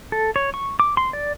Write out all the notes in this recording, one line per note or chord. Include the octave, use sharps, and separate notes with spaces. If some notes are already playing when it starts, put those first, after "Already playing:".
A4
C#5
C#6
D6
C6
D5